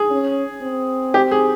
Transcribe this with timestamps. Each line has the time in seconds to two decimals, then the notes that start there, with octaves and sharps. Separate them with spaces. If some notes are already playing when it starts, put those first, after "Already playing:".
Already playing: G#4
0.10 C#4
0.63 C4
1.14 G4
1.31 G#4